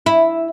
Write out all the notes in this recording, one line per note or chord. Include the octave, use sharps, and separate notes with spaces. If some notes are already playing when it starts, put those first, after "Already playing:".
E4